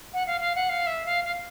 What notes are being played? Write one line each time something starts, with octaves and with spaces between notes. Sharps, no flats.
F#5
F5
F5
F#5
F5
E5
F5
F5